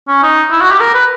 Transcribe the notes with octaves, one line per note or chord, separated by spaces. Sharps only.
C#4
D#4
E4
F#4
G4
A#4
B4